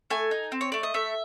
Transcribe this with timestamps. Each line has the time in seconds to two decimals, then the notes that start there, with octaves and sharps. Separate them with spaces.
0.10 A3 G#5
0.31 D#4
0.52 C4
0.61 C#5
0.72 A3 D5
0.83 D#5
0.94 A3 E5